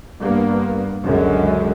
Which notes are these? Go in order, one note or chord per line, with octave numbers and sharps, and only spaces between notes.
G2 A#3 B3
C#2 F#2 D3 G#3